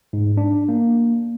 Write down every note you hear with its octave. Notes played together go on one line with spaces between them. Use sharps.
G#2
D4
A#3